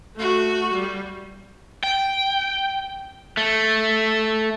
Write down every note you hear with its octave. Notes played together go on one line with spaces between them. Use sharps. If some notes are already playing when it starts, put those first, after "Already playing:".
A3 F#4
G3
G5
A3